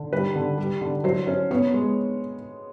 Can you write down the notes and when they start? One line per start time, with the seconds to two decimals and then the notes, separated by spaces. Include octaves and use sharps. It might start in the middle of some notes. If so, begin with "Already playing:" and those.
Already playing: D3
0.13 G3 B4
0.36 D3
0.58 G3
0.81 D3
1.04 F#3 C5
1.27 C#4
1.51 B3 C#5
1.74 G#3